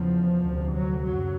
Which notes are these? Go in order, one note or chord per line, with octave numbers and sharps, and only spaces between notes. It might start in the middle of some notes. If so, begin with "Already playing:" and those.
Already playing: E2 C#3 F3
D2 C3
F#3
F#2 C#3 F#3